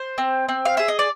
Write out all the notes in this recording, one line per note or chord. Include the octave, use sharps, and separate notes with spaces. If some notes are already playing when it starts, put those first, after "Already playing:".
Already playing: C5
C4
C4
F5
G#4 E5
D#5
D5